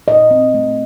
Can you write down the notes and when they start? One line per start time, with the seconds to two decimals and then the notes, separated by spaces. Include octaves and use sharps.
0.08 A#2 D#5
0.31 C4
0.54 A3